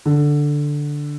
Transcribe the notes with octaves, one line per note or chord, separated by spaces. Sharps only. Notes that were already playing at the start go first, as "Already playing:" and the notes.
D3